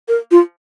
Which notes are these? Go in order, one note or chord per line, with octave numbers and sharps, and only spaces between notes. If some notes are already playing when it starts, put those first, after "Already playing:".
A#4
F4